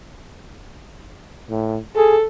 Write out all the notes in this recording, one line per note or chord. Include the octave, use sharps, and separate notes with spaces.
A2
G#4 A4